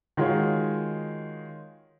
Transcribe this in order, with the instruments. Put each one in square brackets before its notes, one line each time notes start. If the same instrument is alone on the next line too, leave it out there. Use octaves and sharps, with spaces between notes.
[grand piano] D#3 G#3 F4 F#4 G#4 C#5